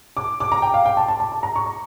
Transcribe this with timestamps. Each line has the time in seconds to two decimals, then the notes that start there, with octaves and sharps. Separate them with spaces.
0.17 D6
0.40 D6
0.52 A#5
0.62 G5
0.74 F5
0.85 G5
0.97 A5
1.08 A5
1.20 A5
1.32 A5
1.43 A#5
1.56 C#6
1.66 A#5